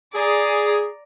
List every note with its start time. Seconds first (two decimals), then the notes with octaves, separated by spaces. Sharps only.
0.14 G#4 D5 A#5